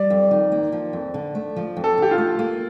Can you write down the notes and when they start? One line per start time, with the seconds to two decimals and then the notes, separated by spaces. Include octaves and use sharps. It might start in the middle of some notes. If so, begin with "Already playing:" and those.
Already playing: G3 D5
0.10 F2
0.31 D#3
0.52 A#3
0.72 F3
0.93 F2
1.14 D3
1.35 A3
1.56 F3
1.77 F2
1.84 A4
1.98 D3 G4
2.11 F4
2.18 A3
2.39 A#3